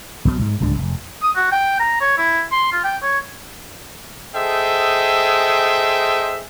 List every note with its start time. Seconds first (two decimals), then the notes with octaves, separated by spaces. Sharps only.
0.25 B1 B2 F#3
0.41 G#2
0.60 D1 C#2 G#2 D4
0.79 F1
1.23 D#6
1.36 F#4
1.52 G5
1.80 A#5
2.01 C#5
2.18 E4
2.52 C6
2.72 F4
2.84 G5
3.03 C#5
4.35 G#4 A4 C5 D#5 E5 G5